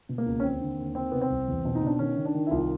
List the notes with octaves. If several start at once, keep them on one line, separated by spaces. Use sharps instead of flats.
B2
A#3
C#2
C#4
D#2 C4
D3
D#2
D#3 C4
C3 B3
C4
C2
E2
B2
D#4
B2 D4
D#3 C#4
D#3
D4
D#3
E4
C2 F4